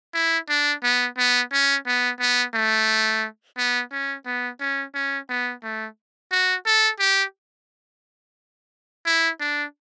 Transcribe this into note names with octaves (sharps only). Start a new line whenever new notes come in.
E4
D4
B3
B3
C#4
B3
B3
A3
B3
C#4
B3
C#4
C#4
B3
A3
F#4
A4
G4
E4
D4